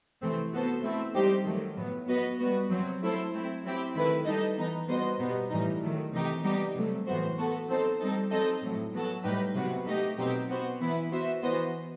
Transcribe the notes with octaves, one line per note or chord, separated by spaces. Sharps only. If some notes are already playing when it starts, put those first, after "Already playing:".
C3 E3 A3 C4
B3 F#4 A4 C5
A3 C4 E4 A4 E5
G3 D#4 G4 C5
D#3 F#3 A3
A2 F#3 B3
B3 F#4 B4 D#5
G3 B3 F#4
C3 F#3 C4
F#3 A3 E4 A4 C5
A3 C4 E4
F#3 C4 E4 G4
D#3 A3 E4 B4
G3 D#4 A4 D#5
E3 B3 D#4
G3 B3 F#4 C5 D#5
B2 G3 B3 D#4
A2 E3 G3 D#4
D#3 F#3 A3
C3 E3 A3 D#4 G4
G3 B3 D#4 G4
C3 F#3 A3
A2 E3 B3 F#4 C5
B3 F#4 A4
F#3 C4 D#4 A4 C5
G3 C4 D#4 A4
F#3 C4 D#4 A4 D#5
A2 F#3 A3
F#3 B3 F#4 A4
A2 G3 D#4 G4 B4
C3 F#3 B3 F#4 B4
A3 D#4 G4 D#5
B2 F#3 C4 D#4 G4
B3 F#4 C5
E3 B3 E4 B4
B3 F#4 C5 E5
E3 B3 F#4 C5 D#5